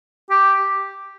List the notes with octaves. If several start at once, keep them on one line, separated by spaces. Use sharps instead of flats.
G4